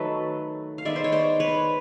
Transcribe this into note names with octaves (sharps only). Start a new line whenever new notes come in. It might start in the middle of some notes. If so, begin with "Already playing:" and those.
Already playing: D#3 F#3 A3 A4 B4
F5
D#3 G#3 B3 D5 E5
C5
C#5
C5 D5
B4 C#5